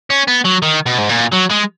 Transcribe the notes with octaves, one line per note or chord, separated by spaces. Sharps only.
C#4
B3
F#3
D#3
B2
G#2
A#2
F#3
G#3